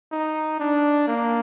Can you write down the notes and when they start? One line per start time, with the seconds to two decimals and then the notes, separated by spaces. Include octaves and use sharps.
0.12 D#4
0.60 D4
1.07 A#3